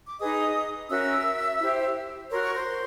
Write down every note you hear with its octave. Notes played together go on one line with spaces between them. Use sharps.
D6
D#4 G#4 B4 D#5 D#6
C#4 F#4 A#4 E5 E6
E4 G4 C5
F#4 A#4 C#5 C6
C#6
C5 C6